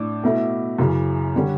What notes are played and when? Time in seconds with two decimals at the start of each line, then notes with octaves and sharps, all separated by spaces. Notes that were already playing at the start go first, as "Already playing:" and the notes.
Already playing: A2 D4 D6
0.23 B2 A3 E4
0.78 F#2 C#3 E3
1.36 D3 G3 C#4